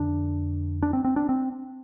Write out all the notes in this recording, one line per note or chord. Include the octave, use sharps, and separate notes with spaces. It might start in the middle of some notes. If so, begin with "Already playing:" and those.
Already playing: F2 D3 D4
D4
C4
C4
D4
C4